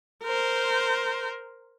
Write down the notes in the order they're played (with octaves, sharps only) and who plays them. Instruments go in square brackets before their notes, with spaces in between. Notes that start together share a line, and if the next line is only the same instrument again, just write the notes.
[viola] A#4 C5